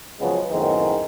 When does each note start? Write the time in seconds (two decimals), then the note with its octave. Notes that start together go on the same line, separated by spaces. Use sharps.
0.19 C#2 C#3 F3 F#3 G#3 B3
0.50 F#2 A2 D#3 G#3 B3 C4